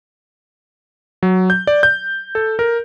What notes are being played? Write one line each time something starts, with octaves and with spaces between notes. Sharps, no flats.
F#3
G6
D5
G6
A4
A#4